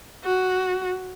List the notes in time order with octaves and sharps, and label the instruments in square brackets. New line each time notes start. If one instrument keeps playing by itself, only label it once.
[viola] F#4